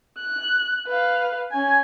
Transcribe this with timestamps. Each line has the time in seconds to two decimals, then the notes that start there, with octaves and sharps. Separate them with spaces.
0.18 F#6
0.87 B4 F5
1.51 C#4 G#5